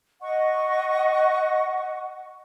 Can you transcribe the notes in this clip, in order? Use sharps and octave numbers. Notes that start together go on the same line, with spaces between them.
D#5 F#5 C#6